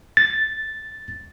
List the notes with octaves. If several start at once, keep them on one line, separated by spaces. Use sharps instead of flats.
A6